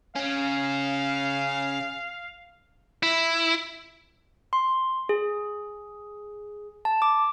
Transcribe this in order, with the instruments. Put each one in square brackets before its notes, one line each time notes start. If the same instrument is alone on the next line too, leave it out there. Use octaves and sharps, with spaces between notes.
[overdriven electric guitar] C#3 C#4 [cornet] F5
[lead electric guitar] E4
[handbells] C6
G#4
A5
D6